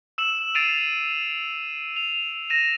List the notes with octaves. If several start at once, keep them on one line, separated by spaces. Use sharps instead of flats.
E6 E7 F#7
A6 C7 D7 D#7 F7 F#7
F7
A#6 D#7 E7